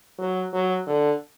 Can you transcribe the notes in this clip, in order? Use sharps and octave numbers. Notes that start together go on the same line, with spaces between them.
F#3
F#3
D3